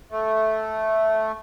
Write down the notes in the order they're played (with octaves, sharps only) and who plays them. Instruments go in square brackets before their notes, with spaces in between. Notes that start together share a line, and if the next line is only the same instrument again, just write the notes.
[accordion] A3